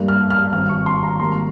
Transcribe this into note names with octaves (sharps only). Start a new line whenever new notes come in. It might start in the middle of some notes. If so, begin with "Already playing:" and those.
Already playing: G2 G3 A#3
F6
F6
G#1 G2 G3 C4 F6
C#6
C6
A#5
G#1 G#2 G3 A#3 C6